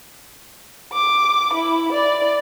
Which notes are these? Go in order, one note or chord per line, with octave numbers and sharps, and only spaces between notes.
D6
E4
D5